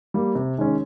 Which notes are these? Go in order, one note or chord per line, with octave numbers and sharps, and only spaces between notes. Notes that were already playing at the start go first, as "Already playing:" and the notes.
G3 A#3
C3
D#3 G#3 C#4